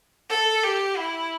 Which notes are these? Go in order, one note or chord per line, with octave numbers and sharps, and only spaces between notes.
A4
G4
E4